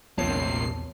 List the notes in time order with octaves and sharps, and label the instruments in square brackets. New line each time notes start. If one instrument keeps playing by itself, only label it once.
[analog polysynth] A#1 C7 [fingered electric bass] E2 B3 [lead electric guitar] A2 C3 [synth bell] C#5 A5